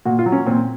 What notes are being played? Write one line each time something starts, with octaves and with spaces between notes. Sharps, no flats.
A#2 F#4
F4
F#3
C#4
A#2 C4